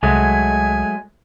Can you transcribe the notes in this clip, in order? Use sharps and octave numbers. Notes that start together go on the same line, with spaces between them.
C2 F#3 G#3 A3 G#5